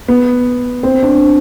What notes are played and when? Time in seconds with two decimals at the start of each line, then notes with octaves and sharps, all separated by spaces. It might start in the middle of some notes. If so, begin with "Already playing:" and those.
0.08 B3
0.83 C4
1.03 D4